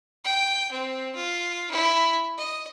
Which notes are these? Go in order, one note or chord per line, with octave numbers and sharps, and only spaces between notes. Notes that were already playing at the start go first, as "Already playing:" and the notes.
G5
C4
F4
E4
D#5